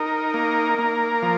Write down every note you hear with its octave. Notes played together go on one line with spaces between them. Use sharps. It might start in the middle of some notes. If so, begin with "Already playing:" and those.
Already playing: D#4 A#4
A#3
A#3
F3